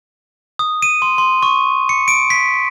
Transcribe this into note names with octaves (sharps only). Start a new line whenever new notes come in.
D#6
D#7
C6
C6
C#6
C#7
D7
B6